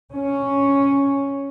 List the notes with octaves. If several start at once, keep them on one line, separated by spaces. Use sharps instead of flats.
C#4